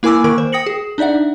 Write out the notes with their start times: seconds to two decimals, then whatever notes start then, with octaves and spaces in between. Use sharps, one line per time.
0.03 A#3 E4 A#4 G#5 D6 E6
0.24 D#3 A#3 A#4 C#6 G#6
0.38 C5
0.53 G5 D#6 A#6 C#7 F#7
0.66 G#4
0.98 D4 D#4 D5 E5 F#5